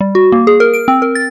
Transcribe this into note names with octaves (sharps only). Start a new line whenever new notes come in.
G3
F#4
A#3
G#4
A#4
D7
C4
A#4
A6